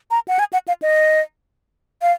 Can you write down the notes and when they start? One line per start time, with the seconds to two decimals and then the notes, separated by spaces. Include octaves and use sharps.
0.11 A#5
0.28 F#5
0.39 G#5
0.53 F#5
0.68 F5
0.82 D#5
2.02 F5